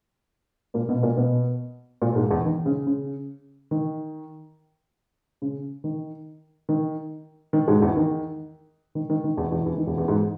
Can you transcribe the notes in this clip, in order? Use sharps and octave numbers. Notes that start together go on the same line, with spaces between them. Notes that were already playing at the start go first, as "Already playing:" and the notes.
A#2 A#3
B2 B3
A#2 A#3
B2 B3
A#2 A#3
A#3
G#2 G#3
E2 E3
D#3
C#3
C#3
D#3
C#3
D#3
D#3
D#3
G#2 G#3
E2 E3
D#3
D#3
D#3
D#3
E2 E3
E2 E3
E2 E3
D#3
E2 E3
E2 E3
G#2 G#3